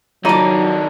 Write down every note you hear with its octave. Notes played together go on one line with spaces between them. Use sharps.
D#3 F#3 D4 D#4 F4 G#4 C#5 D6